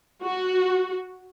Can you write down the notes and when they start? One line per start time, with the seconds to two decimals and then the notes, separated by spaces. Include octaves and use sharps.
0.23 F#4